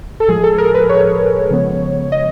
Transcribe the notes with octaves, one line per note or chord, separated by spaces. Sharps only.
A4
A2 F3 G#3 G#4
A4
A#4
B4
C#5
C#3 F3 G#3 B3
D#5